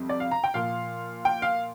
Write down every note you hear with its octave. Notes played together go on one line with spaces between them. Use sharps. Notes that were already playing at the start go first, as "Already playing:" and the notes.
Already playing: F2 C3 G3
D5
F5
A#5
G5
A#2 F3 F5
G5
F5